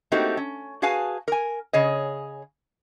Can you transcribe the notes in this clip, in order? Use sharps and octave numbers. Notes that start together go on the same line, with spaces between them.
A3 A#3 C4 D#4 F#4 G4
C#4
F#4 G#4 B4 F5 G#5 A5
A#4 G#5
C#3 G#4 C#5 D#5